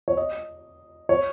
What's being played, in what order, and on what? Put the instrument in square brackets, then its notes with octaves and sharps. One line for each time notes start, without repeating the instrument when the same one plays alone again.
[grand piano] C#5
D#5
C#5